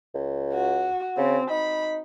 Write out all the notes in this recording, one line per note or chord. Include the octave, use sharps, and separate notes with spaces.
C#2
F#4
C#3 C4
D#4 B5